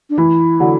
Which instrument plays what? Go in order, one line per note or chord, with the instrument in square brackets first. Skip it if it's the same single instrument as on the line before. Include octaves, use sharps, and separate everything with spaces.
[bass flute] D4
[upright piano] E3 [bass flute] E4
[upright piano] D3 F#3